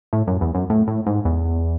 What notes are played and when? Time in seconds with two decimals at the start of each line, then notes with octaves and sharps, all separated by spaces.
0.13 A2
0.27 F#2
0.41 E2
0.55 F#2
0.70 A2
0.87 A2
1.07 G#2
1.25 E2